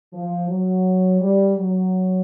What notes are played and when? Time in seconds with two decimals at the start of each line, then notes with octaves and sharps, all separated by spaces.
0.13 F3
0.49 F#3
1.21 G3
1.58 F#3